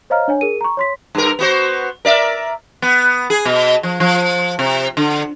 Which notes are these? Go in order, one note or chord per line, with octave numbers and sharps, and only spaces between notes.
C5 C#5 D#5 F5 A#5 F6
D4 C#5 G#5
G#4 A#4 D#7
A#5 C#6
C#5 C6 B6
G2 A#4
B3 F#4 C5
A#4 D5 E5
B3
G#4
B2
F3
F3
C3
D3